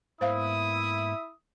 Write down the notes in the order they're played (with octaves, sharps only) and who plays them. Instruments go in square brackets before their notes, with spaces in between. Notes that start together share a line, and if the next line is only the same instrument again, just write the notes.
[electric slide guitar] G#2 A#3 B3 [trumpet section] E4 E5 [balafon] C5 F5 [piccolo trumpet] D#6